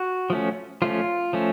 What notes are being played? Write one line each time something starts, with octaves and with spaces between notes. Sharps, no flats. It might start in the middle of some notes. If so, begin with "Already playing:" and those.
Already playing: F#4
F3 A3 C#4
F3 A3 C#4 F4
F3 A3 C#4